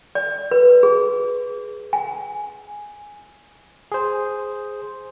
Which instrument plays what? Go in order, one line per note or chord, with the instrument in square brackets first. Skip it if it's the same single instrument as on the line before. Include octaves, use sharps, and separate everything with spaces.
[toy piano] D5
B4
G#4
G#5
[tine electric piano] G#4 C5